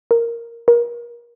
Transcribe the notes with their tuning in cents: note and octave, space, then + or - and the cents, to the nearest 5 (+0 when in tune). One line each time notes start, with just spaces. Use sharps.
A#4 +0
A#4 +30